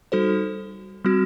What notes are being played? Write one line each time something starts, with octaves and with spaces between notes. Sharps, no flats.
G3 D#4 F#4 A4 C5
G3 C4 F#4